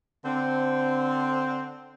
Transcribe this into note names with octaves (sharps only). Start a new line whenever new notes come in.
D3 C4